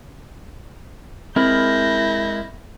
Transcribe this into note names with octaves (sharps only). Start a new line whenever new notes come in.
G#3 C4 E4 A#4 B5 G6 A#6